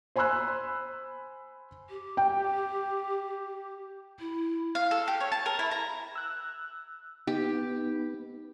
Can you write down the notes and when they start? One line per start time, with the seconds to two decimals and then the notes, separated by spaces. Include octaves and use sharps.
0.16 C5 G#5 B5 C6 E6 F#6
1.90 G4
2.17 G5
4.20 E4
4.75 F5
4.91 A4
5.08 G4
5.20 C#5
5.32 A5
5.46 A#4
5.59 E4
5.71 A#5
6.15 E6 F#6
7.27 B3 D#4 G4